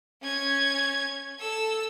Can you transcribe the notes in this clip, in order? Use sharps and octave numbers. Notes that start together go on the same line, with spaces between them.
C#4 G#6
A4 E6